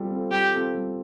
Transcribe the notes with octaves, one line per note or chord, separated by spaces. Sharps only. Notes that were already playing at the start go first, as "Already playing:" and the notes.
Already playing: G3 C4 F4 A4
C4 F4 A4
G3 G4
C4 F4 A4
G3